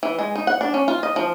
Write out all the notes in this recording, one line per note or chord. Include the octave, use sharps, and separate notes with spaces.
E3
G#3
D#4
F#5
D4
C#4
F4
D#5
F3